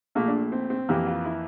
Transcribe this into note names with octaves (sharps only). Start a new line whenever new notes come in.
A#1 A#2 A3 A#3
D4
C4
C4
F2 E3 A#3 G4
F4
E4